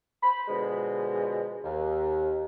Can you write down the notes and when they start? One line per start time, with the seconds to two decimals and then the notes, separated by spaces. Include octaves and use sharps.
0.23 C5 B5
0.48 B2 D3 F3 G#3
1.64 D#2